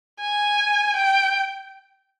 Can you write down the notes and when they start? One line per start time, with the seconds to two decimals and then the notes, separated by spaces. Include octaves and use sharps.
0.21 G#5
0.96 G5